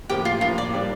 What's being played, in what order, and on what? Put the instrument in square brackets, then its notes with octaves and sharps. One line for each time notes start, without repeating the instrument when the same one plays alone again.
[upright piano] A2 F3 A#3 [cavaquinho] G4
[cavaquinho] F4
[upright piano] A2 F3 A#3 [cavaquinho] F4
[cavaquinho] D5
[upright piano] G3 D4 G4